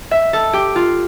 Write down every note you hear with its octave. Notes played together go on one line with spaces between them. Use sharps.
E5
A4
G4
F4